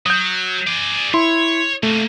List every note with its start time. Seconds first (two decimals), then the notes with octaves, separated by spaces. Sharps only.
0.06 F#3 D#6 G6
0.67 G#4 D5
1.14 E4 C#5 C6
1.83 C3 A3 A#3